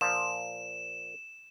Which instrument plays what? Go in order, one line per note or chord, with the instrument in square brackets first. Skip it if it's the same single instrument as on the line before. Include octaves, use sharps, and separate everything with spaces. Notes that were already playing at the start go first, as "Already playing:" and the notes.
[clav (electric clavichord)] A#2 F3 [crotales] E7